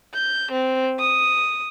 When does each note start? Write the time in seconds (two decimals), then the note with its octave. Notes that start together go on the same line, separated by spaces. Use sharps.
0.14 G6
0.51 C4
1.00 D#6